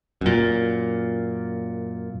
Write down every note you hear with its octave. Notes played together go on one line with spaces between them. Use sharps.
F#2 A#2